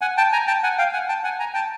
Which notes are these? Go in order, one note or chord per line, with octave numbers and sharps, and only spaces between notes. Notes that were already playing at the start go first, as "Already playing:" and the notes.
F#5 G#5
G5 A5
G#5 A#5
G5 A5
F#5 G#5
F5 G5
F#5 G#5
G5 A5
F#5 G#5
G#5 A#5
G5 A5